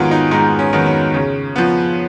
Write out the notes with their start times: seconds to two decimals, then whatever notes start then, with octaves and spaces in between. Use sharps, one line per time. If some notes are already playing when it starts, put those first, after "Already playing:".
Already playing: G#2 D#3 F#3 B3 F4 G#4
0.11 D#4
0.31 G#2 D#4
0.59 C#4
0.73 D#3 F#3 B3
0.86 C#4
1.14 C#3
1.56 F3 B3